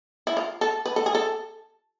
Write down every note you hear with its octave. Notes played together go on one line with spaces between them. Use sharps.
E4
F4
A4
B4
A4
G#4
A4